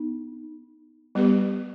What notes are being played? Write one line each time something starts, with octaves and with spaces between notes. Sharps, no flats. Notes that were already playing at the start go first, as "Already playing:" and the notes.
Already playing: B3 D#4
G3 B3 G4 B4